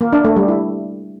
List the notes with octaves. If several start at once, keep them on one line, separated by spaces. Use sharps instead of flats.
A#3
D4
A3
G3
E4